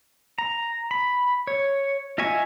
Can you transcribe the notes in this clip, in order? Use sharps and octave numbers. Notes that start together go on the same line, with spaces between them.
A#5
B5
C#5
F4 D#5 E5 G#5 C#6